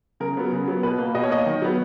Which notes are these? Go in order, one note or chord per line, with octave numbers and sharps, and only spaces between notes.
C#3 A#4
F#3 B3
C#3
F#3 B3
B2 B4
A#3
B2 D#5
C#5
A#3 D#5
D#3
F#3 B3